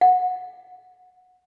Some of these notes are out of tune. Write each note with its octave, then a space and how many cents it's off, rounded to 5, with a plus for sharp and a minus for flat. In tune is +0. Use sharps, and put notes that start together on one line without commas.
F#5 -20